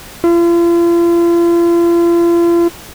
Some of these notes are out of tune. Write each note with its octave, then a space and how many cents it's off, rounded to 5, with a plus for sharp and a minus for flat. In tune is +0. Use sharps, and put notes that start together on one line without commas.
F4 -40